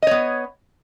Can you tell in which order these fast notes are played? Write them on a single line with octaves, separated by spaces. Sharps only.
D#5 C#5 B3